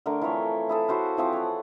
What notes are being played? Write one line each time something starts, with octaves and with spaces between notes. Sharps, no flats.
D3 A3 A#4 A#5
E3 F3 C4 C#5
E4 G#4 A4
E4 F#4 C5 F5
E3 F3 C4
C#5 F#5